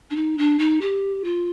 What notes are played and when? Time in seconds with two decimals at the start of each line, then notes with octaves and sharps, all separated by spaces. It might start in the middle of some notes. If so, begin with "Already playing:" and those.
0.10 D4
0.15 D#4
0.37 D4
0.58 D#4
0.80 G4
1.23 F4